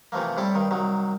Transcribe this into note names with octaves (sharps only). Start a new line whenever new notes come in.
C3 E3 F3 A3 A#3
A2 G3 C4 E4 A4 D6
G2 D#3
C2 D#3 F#3